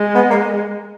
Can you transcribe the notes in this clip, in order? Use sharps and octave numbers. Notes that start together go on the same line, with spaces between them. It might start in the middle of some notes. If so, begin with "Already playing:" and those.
Already playing: G#3
B3
A#3